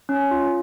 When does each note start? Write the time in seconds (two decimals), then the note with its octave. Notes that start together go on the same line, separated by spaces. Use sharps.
0.09 C#4
0.31 F4